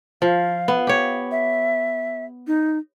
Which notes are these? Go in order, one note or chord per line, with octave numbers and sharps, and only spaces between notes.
F3 F5
B3
G4 C#5
E5
D#4